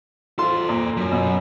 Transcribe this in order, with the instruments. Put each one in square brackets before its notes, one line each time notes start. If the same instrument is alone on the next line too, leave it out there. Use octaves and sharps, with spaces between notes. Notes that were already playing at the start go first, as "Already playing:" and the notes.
[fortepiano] F4 C6 [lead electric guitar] A4 C5
[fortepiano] A#2
[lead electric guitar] F#2
[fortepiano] B2